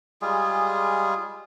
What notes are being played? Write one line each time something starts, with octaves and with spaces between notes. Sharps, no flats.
G3 G#3 F4 G#4